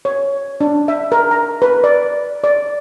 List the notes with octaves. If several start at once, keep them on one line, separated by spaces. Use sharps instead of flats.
C#5
D4
E5
A#4
A#5
B4
D5
D5